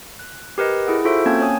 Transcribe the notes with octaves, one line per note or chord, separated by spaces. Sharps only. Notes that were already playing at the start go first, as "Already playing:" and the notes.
F#6
G4 A#4 B4 D#5
E4 G#4 F#5
F4 F#4 A4 C5 E5
A#3 C4 C#4 A5 G#6
C#5 G#5 D#6